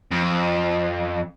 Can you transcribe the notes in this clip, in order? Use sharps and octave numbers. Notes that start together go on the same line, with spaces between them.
F2